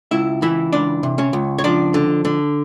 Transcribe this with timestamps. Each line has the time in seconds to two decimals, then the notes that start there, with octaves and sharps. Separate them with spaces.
0.11 C#2 E4 E5
0.42 E3 E4 E5
0.72 C#2 D4 D5
1.03 C3
1.18 C#4 C#5
1.33 C#2
1.58 C#5
1.64 F3 D4 D5
1.94 D3
2.25 D3